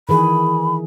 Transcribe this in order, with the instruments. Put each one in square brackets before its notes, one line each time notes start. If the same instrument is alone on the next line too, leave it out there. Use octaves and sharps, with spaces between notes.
[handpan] D#3 E3 G#4 [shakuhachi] B5